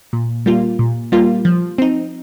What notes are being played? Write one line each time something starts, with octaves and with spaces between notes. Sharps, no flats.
A#2
G3 A#3 F4
A#2
G3 A#3 F4
F3
C4 D#4